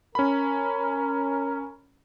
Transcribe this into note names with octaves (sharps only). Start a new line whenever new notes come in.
C#4 A#4 B5